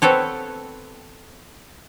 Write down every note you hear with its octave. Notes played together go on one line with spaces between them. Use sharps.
B3 C4 A4 C#5